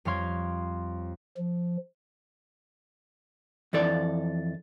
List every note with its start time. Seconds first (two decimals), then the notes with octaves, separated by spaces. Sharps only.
0.05 F2 G3 C#5 F5 C6 G#6
1.37 F3
3.73 F2 E3 A4 D5